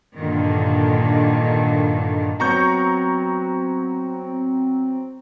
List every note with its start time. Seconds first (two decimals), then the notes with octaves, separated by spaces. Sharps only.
0.15 G2 A#2 D3 D#3
2.40 F#3 B3 C4 F#4 A#5 C#6 G6